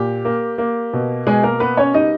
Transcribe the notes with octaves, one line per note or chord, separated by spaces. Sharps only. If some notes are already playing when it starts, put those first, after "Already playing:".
Already playing: A#2 G4
A#3
A#3
B2
B2 G#3 G#4
A#3 A#4
A#3 B3 B4
C#4 C#5
G3 D#4 D#5